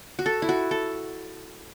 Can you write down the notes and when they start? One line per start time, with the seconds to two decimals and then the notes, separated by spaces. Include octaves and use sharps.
0.19 F#4
0.26 A4
0.42 E4
0.49 F#4
0.71 A4